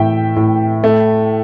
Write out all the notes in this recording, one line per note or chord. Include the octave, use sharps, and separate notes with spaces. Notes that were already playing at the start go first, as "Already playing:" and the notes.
Already playing: A2 E3 E5 G5
A2
A3